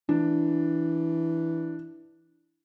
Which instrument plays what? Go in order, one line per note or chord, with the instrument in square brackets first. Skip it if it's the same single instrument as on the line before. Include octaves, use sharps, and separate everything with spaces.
[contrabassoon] E3 [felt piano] D4